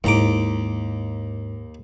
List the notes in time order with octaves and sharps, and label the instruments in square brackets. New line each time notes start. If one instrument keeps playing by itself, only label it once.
[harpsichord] D#2 A#5 D6 [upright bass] G#2 E4